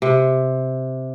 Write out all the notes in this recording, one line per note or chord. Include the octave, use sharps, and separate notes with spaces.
C3